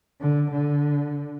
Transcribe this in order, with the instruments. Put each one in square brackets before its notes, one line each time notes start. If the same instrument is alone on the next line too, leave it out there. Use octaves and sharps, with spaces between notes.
[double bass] D3
D3